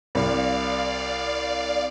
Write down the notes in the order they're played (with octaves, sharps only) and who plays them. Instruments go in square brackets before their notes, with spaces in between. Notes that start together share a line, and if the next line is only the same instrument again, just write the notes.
[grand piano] C2 [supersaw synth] D5 F5